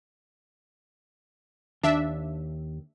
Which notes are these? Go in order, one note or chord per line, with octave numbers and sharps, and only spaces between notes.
D#2 D4 E5